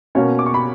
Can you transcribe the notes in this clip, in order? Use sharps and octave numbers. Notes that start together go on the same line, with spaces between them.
B2 A#3 C#4 C#5
D6
C#6
B5